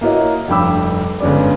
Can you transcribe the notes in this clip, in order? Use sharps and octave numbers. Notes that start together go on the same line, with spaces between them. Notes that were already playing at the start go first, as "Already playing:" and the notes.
A#3 E4 F#4 C#5 D#5
F1 G2 G5 B5 D6 E6
G1 G#3 C#4 D5